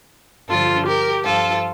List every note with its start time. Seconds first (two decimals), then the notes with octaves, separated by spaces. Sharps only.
0.48 G2 D3 F3 F4 A4
0.86 G4 A#4
1.24 G2 F3 F4 A4